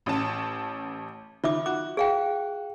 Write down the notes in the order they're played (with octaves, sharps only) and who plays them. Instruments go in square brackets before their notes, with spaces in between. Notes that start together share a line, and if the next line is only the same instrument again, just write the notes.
[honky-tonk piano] A1 C#4 A5
[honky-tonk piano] D#3 [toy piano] F4 E5 D6
[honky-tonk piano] F#4 [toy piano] D6
[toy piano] G#4 F5 G5